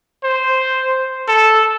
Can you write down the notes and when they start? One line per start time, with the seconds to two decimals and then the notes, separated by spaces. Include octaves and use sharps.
0.24 C5
1.28 A4